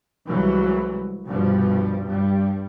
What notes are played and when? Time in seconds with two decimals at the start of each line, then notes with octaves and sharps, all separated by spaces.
0.26 C2 E3 F#3 G#3
1.26 C2 G2 B2 F3 G3
2.06 G2 G3